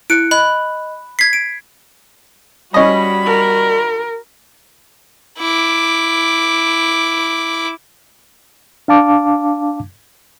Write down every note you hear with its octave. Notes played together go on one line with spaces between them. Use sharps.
E4 F#6 C#7 D7
D#5 B5 F#6
G#6 B6 C7
D7
G3 C#4 F#4 D#5 B5
A#4
E4 D6
D4 F5 A5 D6